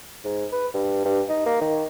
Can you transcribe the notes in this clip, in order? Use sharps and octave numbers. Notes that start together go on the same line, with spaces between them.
G#2
B4
G2
G2
D#4
A#3
D#3